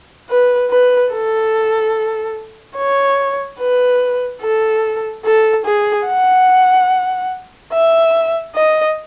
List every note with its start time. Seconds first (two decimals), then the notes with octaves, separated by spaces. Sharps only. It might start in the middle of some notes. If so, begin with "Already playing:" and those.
0.30 B4
0.71 B4
1.12 A4
2.78 C#5
3.60 B4
4.42 A4
5.25 A4
5.66 G#4
6.07 F#5
7.73 E5
8.55 D#5